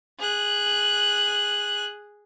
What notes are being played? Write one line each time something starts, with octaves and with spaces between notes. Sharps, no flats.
G#4 F#6